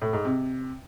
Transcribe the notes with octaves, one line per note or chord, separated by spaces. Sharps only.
A2
G#2
C3